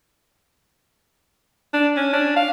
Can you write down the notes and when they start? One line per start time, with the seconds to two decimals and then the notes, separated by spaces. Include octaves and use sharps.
1.74 D4
1.97 C#4
2.13 D4
2.36 F5